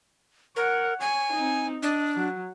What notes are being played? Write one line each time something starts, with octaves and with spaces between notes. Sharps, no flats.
A#4 C#5 F#5
C#5 G#5
C4 D#4
D4 D#5
F#3